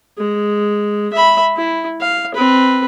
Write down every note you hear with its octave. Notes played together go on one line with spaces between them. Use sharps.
G#3
E5 B5
E4
F5
C4 B4